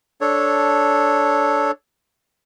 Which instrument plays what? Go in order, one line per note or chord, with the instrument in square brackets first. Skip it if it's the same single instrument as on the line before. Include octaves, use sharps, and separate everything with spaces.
[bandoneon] D4 A4 C#5